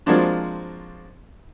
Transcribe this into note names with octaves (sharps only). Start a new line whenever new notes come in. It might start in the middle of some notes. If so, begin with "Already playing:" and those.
F3 G#3 A#3 C4 D4 F#4